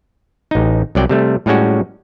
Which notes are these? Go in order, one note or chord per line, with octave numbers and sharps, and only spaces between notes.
A1 D#4
C2 F#3 D5 G5
C3 G3 A3
A2 G3 G#3 C#4 F#4